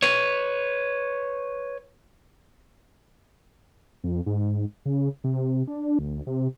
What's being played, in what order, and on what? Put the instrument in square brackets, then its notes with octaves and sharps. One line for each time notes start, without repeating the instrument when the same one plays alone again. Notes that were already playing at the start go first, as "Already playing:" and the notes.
[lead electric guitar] B4 C#5
[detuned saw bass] F2
G#2
C#3
C3
D4
D2
C3